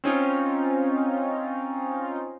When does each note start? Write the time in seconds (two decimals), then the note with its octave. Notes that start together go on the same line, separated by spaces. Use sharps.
0.04 C4 C#4 D#4 F4